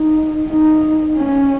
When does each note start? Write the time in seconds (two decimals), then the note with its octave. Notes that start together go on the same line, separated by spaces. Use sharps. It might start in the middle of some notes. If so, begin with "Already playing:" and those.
Already playing: D#4
0.48 D#4
1.17 C#4